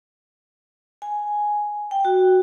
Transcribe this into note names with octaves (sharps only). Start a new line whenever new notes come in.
G#5
G5
F#4